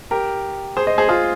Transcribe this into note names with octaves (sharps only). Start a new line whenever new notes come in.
G4 A#4
G#4 C5
C5 D#5
G#4 C5
F4 G#4